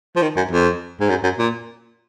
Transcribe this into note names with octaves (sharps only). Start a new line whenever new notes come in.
F3
D#3
F#2
F2
G#2
F#2
F#2
A#2